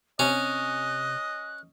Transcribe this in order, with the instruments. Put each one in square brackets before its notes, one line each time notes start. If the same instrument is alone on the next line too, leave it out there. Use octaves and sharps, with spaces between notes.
[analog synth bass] C3 [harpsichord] C#4 [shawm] D#5 [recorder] F#6